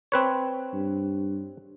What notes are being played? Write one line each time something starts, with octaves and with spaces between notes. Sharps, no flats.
C4 B4 C#5
G2